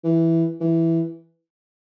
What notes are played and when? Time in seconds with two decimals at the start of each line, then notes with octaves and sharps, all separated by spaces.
0.04 E3
0.61 E3